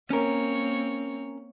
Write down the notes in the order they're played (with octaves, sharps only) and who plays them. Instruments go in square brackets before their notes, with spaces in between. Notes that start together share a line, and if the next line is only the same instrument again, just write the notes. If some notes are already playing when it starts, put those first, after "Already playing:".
[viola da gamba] A#3 C4 C#5 [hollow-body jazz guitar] C#4 A#4